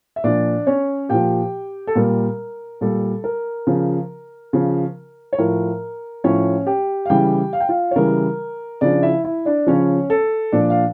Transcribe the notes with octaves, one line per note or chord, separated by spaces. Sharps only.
E5
A#2 F3 D4 D5
C#4 C#5
A#2 F3 G4 G5
A4
A#2 G3 A#4
A#2 G3 A4
A#4
C#3 F3
C#3 F3
C#5
A2 F3 A#4
A2 F3 C#4 C#5
G4 G5
F5
C#3 E3 G3 G4 G5
F5
G5
F4 F5
C#5
C#3 E3 G3 A#4
C#3 F3 D4 D5
E4 E5
E4 E5
D4 D5
C#3 F3 C#4 C#5
A4
A#2 F3 D4 D5
F5